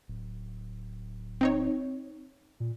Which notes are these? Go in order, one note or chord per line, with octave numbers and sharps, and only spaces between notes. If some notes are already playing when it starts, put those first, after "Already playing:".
D1
C4 D#4 C#5
A#2